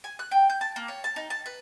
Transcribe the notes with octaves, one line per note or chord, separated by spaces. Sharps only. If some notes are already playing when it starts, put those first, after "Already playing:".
G#5
F#6
G5
G6
A5
A#3
C#5
A5
D#4
A5
B4